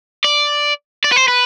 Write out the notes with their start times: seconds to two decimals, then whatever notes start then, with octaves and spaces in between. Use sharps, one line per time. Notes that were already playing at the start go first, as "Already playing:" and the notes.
0.24 D5
1.04 D5
1.12 B4
1.16 C5
1.28 B4